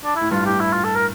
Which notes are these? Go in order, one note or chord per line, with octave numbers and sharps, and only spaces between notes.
D4
E4
A2
G2 F4
A2 G4
E4
F4
A4
A#4